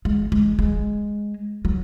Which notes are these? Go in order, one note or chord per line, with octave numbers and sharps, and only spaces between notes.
G#3
G#3
G#3
F#3